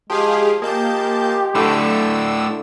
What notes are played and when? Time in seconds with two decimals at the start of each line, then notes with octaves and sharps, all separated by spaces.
0.10 F3 G#3 G4 G#4 F5
0.62 A#3 G4 G#4 D#5 A5 G6
1.55 A2 D3 A3 D4 B4 E6